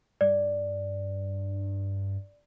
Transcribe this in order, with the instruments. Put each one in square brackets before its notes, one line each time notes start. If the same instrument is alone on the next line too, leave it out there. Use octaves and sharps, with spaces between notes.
[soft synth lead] G2 [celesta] D5